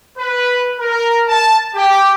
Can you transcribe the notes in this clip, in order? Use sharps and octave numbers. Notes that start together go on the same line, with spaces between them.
B4
A#4
A5
G4